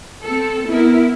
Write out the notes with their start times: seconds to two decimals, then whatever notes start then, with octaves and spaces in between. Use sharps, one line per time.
0.24 C4 A4
0.68 B3 E4 A#4